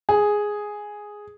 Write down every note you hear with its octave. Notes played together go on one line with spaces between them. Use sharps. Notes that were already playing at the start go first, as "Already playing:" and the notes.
G#4